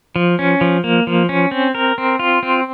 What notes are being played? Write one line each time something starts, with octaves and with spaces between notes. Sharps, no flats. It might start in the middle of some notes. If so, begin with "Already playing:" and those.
F3
C#4
F3
A#3
F3
C#4
C4
A#4
C4
F4
C4